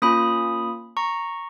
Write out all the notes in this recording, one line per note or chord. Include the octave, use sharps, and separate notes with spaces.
A#3 C#4 F4 B5 D#6
A#5 C#6